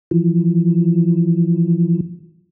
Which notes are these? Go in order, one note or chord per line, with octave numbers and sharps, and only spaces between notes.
E3 F3